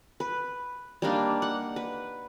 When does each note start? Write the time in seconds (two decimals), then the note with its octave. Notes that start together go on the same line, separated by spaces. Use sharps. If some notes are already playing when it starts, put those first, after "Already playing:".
0.20 B4
1.02 G3 A#3 D4 D#4
1.42 F#5
1.76 B4